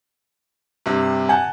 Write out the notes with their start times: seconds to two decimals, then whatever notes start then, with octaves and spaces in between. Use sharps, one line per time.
0.86 G2 C3
1.29 F#5 G#5 A5 G6